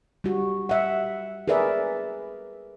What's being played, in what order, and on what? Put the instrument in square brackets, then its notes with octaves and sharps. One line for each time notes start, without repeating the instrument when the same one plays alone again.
[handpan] G3 F#4
E5 F#5
G#4 A#4 B4 D5 E5